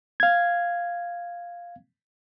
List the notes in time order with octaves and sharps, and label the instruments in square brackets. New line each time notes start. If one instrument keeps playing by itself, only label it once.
[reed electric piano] F5 G#6